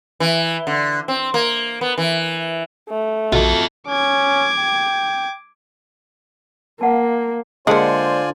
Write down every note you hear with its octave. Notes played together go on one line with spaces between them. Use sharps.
E3
D3
C4
A#3
B3
E3
A3
A#1 B2 F4 A4 F#5
C#4 D6 G#6
G5
A#3 F5 F#5 A5
D3 G#3 A#3 F4 C5 D5 F#5 G#5